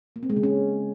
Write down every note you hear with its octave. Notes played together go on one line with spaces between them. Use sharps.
A#3
C4
G#3
C#3
C#4